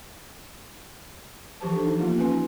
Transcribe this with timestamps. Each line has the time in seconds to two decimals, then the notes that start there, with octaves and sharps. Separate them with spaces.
1.61 E3 F3 G4 C5 A5
1.72 D4 A4
1.85 F3 D#4
1.99 F3 A#3 B3 F4
2.18 C#4 B4 G#5 C6
2.31 D#4